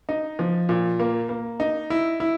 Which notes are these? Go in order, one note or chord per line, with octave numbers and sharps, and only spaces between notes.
D#4
F3
A#2
A#3
A#3
D#4
E4
E4